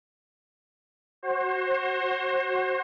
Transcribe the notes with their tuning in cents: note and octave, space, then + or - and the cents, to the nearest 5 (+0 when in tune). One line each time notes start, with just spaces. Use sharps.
F#4 +5 C5 +35